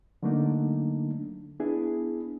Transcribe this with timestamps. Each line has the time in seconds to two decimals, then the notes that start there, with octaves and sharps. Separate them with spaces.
0.23 D3 F#3 A3 A#3 D4 D#4
1.60 B3 D4 E4 G#4